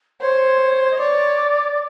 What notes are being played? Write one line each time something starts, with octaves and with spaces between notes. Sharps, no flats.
C5 C#5
D#5
C#5 D5